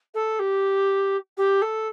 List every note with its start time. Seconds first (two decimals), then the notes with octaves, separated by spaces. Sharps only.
0.14 A4
0.39 G4
1.37 G4
1.62 A4